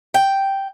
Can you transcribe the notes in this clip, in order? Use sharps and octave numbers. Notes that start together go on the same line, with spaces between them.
G5